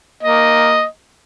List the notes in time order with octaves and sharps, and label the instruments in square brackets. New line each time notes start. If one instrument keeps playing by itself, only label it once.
[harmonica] A#3 D#5